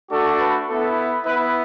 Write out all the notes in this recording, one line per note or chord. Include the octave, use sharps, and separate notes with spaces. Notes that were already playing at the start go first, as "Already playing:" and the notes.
A3 D4 F#4 A4
B4
B3 E4 A4
B3 E4 B4